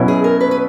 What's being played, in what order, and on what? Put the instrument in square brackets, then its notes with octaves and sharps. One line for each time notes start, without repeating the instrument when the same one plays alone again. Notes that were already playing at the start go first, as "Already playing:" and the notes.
Already playing: [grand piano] B2 F#3 C#4 E4
[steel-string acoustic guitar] G#4
A#4
B4
B4